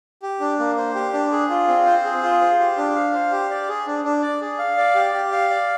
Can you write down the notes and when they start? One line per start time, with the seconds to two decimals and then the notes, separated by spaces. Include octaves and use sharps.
0.23 G4
0.40 D4
0.59 A#3
0.77 C5
0.95 G4
1.13 D4
1.32 G#4
1.50 F4
1.68 C4
1.86 C5
2.05 G#4
2.23 F4
2.41 C5
2.59 G4
2.78 D4
2.95 F5
3.13 C5
3.32 G4
3.50 D5
3.68 G#4
3.87 D4
4.04 D4
4.22 D5
4.41 G#4
4.59 F5
4.77 D5
4.95 G4
5.13 G4
5.32 F5
5.50 D5